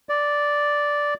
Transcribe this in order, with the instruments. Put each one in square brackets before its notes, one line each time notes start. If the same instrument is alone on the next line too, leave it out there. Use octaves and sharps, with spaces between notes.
[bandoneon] D5